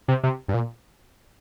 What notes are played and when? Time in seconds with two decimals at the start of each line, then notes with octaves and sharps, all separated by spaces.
0.08 C3
0.23 C3
0.48 G2
0.54 A#2